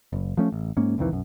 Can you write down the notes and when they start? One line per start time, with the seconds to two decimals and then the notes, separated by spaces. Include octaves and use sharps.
0.13 F#1
0.37 F3 A3 C#4
0.52 A1
0.77 G#2 A#3 C#4
0.98 C2 F2 D#3 E3
1.11 B1 F#2